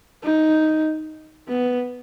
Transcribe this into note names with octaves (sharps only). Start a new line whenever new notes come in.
D#4
B3